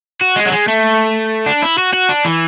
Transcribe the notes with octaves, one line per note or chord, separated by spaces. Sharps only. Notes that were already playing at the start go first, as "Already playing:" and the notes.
F#4
G#3
F#3
G#3
A3
D4
E4
F#4
F#4
D4
E3